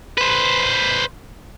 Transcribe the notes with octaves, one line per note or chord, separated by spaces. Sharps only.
B4 C5